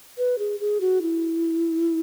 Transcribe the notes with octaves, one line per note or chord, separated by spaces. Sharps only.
B4
G#4
G#4
F#4
E4